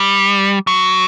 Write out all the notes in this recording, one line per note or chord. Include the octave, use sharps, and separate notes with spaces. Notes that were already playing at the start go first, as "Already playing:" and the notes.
Already playing: G3
F#3